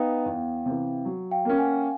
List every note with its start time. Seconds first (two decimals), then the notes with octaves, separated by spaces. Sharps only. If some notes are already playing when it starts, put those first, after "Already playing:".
Already playing: B3 D#4 F5 G5
0.26 E2
0.66 C3 E3
1.05 F#3
1.31 F5 G5
1.45 A#3 C#4
1.58 F#5 G#5